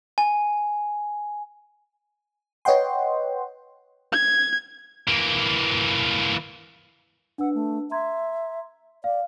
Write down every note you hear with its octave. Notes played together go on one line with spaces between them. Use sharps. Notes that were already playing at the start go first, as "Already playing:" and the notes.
G#5
B4 C#5 D#5 F#5 G5 C6
G#6
E3 A#3
D4 B4 F#5 E6
A3
E5 A#5 C6 G#6
D5 F5